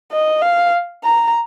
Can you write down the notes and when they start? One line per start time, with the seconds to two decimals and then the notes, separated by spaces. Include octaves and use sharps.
0.11 D#5
0.42 F5
1.04 A#5